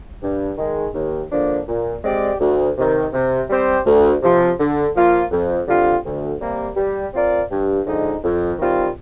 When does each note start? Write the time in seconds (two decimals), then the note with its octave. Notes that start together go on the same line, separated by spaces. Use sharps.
0.23 G2
0.58 D#3 G#3
0.94 D#2
1.31 D3 F3 A#3 D4
1.67 A#2
2.04 G#3 C4 G4 D5
2.40 D2
2.77 C3 D#3
3.13 C3
3.50 G3 C4 G4 C5
3.86 D2
4.22 C3 F3
4.59 D3
4.96 F3 A#3 F4
5.31 F2
5.68 D3 G3 C4 F4
6.05 D2
6.41 C3 G3 A#3
6.77 G3
7.13 C4 F4 A#4 D5
7.51 G2
7.87 D3 F3 G#3 D#4
8.24 F2
8.59 D#3 G3 C4 F4